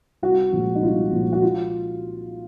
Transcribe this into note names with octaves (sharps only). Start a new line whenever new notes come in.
C2 F#4
A#2 F3 G#3
D#4
C2 F4
A#2 F3 G#3
F#4
F4